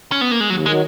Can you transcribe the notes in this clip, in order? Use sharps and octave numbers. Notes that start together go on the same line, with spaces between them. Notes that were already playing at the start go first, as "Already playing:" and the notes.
C#4
B3
A#3
G#3
D#2 F#3
D#3 F#3 G#3